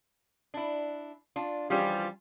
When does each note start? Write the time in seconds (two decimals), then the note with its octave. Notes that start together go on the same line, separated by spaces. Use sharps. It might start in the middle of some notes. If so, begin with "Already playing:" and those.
0.54 D4 E4
1.36 D4 F4
1.70 E3 F3 G3 C#4 F4 G#4